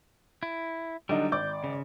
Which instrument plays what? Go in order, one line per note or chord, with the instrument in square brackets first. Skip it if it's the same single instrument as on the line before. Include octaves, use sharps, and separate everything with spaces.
[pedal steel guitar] E4
[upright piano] D3 D4 D#4 [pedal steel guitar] F#3 G3
[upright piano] G#1 D5 D6 [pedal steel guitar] G6
[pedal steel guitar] C#3